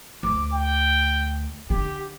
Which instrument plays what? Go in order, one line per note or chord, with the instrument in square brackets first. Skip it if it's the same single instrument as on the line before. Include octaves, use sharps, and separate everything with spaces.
[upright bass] D2 [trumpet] D6
[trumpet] G5
[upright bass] D3 [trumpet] G4